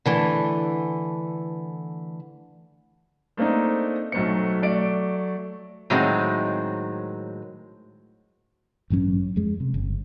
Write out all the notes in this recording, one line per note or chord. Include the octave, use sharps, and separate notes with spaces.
D3 E3 A3
A3 A#3 C4 D4 D#4
B1 F#3 A3 C4 C#7
F#3 A3 D5 D7
A2 D#3 F#3 G#3 C4
A1 G2 F#3 C#4
F2 G#3
C3
G1